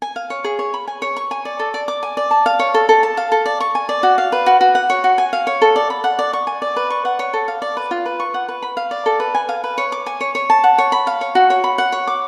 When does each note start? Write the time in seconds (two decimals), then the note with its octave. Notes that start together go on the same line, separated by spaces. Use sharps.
0.02 G#5
0.16 F5
0.30 C#5
0.44 G#4
0.59 C#5
0.74 B5
0.88 G#5
1.02 C#5
1.16 C#6
1.31 G#5
1.45 D5
1.59 A4
1.74 D5
1.88 D6
2.03 G#5
2.17 D5
2.31 A5
2.46 F5
2.59 C#5
2.74 A4
2.89 A4
3.03 A5
3.17 F5
3.32 A4
3.46 D5
3.60 C#6
3.75 G#5
3.89 D5
4.03 F#4
4.18 F5
4.32 B4
4.46 F#4
4.61 F#4
4.75 F#5
4.90 C#5
5.04 F#4
5.18 G#5
5.33 F5
5.47 C#5
5.62 A4
5.76 D5
5.90 B5
6.04 F#5
6.19 D5
6.33 C#6
6.47 G#5
6.62 D5
6.76 B4
6.90 C#6
7.05 F#5
7.19 C#5
7.34 A4
7.48 F5
7.62 D5
7.77 B4
7.91 F4
8.06 B4
8.20 C#6
8.34 F#5
8.48 B4
8.62 B5
8.77 F5
8.91 D5
9.06 A4
9.20 B4
9.35 G#5
9.49 F5
9.64 B4
9.78 C#5
9.92 D6
10.06 G#5
10.21 C#5
10.35 C#5
10.50 A5
10.64 F#5
10.78 C#5
10.92 B5
11.07 F5
11.21 C#5
11.35 F#4
11.50 C#5
11.64 B5
11.78 F#5
11.92 C#5
12.07 D6